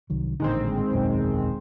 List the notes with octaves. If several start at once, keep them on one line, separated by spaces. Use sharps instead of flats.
C2 D#3 F#3
A1 A#2 D3 D#3 G#3 C4
E1 B1 F#2